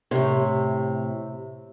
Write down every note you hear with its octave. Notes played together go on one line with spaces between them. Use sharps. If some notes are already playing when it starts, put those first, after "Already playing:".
A2 C3